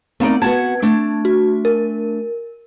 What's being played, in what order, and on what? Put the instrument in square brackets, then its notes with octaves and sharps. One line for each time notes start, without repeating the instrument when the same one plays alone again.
[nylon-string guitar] A3 D#4 D5 [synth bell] B3 C4
[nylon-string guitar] B3 F#4 A5 [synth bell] G#6
[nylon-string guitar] A3 D4
[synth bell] F#4
A#4